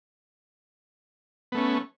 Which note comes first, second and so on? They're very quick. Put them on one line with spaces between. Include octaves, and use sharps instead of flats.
B3 A3 C#4